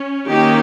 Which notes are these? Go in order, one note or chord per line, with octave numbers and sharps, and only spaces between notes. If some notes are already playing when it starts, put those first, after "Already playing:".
Already playing: C#4
D#3 A#3 C#4 D#4 G4